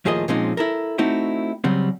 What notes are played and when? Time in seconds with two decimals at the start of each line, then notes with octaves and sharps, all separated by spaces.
0.05 D#2 A2 F3 G#4 A#4 D#5
0.28 A#2 F3 G#3 C4 C#4 D#4
0.57 E4 A4 A#4
0.98 A3 C4 D#4 E4 F#4
1.64 C#3 F#3 G3 C4